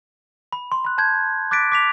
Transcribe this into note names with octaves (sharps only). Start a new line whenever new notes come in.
B5
C6
B5 F#6
A5 G6 G#6
D6 F#6 A6 B6 D7
D6 B6 F7